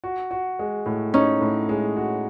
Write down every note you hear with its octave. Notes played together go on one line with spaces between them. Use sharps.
F#4
F#4
G#3
A2
C#4 D#4
A2
G#3
F#4